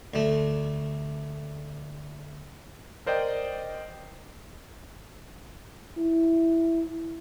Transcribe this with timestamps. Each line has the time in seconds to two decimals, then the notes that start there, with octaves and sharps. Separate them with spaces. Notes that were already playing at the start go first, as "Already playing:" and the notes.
0.14 D2 A3
3.06 A#4 C5 D5 D#5 G5
5.97 E4